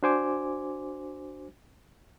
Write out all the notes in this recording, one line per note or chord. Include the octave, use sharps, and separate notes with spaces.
D4 F#4 C5 G#5 D6